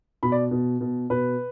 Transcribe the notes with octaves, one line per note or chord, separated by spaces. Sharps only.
B2 B5
D5
B2
B2
B2 B4